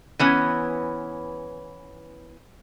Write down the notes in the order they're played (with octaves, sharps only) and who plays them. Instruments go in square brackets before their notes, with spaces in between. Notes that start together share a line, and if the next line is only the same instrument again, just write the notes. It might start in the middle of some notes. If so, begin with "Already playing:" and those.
[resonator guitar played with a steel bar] E3 B3 C#4